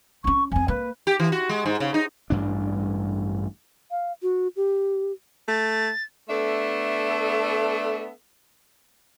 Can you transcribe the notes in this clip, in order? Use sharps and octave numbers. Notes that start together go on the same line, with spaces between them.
C#4 D4 C#6
F2 C4 G#5
A#3 B4
G4
E3
F#4
G#3
G#2
C#3
D#4
A1 G2 D4
F5
F#4
G4
A3 A6
A3 B3 D4 A4 E5